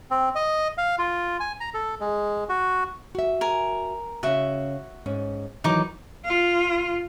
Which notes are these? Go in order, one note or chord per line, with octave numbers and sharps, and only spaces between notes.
C4
D#5
F5
F4
G#5
A#5
A4
G#3
F#4
F#4 E5
A#4 G#5
C#3 C#4 F#4 E5
G#2 C#4
D#3 E3 F#3 D#4 A#4 D6
F4